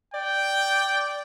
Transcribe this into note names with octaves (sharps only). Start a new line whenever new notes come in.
D5 G5